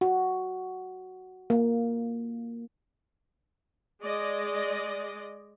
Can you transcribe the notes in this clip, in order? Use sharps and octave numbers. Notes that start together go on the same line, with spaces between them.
F#4
A#3
G#3 D5 D#5